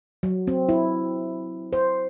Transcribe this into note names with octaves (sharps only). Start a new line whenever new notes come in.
F#3
C4
E4
C5